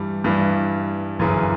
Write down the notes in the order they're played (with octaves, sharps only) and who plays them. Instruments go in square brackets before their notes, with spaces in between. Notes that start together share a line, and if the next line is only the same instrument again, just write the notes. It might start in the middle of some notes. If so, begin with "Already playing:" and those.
Already playing: [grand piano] G2 E3 G3
G2 E3 G3
G1 F#2 C#3 E3